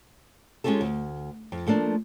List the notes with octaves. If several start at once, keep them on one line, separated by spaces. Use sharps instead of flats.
G#3 C4 C#4 F4 G4 A4
D2
F2
F3 A3 A#3 D4